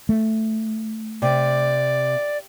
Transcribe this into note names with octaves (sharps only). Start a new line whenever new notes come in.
A3
C3 D5